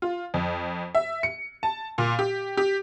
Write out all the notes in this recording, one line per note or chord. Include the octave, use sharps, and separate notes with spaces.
F4
F2
E5
C#7
A5
A#2
G4
G4